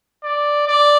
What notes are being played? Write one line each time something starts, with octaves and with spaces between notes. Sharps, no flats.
D5
D5